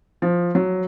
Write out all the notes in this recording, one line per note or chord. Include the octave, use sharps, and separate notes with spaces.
F3
F#3